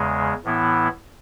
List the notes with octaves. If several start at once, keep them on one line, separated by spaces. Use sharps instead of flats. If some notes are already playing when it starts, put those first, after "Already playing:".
Already playing: E2 C#3 G#3
A2 E3 B3 E4